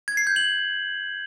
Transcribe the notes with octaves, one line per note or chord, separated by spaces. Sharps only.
G#6
C7
G6
F#7